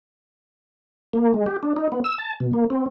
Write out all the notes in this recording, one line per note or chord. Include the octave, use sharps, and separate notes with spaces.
A#3
G#3
G4
D4
D#4
B3
E6
A5
B2
A#3
C4